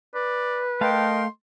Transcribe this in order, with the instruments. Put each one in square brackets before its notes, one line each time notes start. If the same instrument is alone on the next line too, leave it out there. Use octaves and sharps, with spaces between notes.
[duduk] B4 [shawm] D5
[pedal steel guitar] A3 F5 A5 [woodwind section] A#4 D#5 G5 [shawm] C6